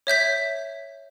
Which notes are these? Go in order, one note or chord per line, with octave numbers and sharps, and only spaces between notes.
C#5 E5 G6 B6